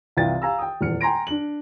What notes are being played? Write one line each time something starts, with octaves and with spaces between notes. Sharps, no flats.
C2 C3 E3 F4 G5 A6
F5 G#5 A#5 E6
G5 D#6
D#1 E2 F6 C#7
G5 G#5 A#5 C6 A#6 D7
D4 F#7